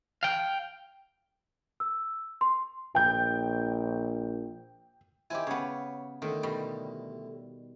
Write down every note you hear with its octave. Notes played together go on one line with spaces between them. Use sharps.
F5 G5
E6
C6
A#1 G5 G6
D#3 C4 E4 G4 G#5
C#3 B3 C#5
A2 D3 D#3
B2 G3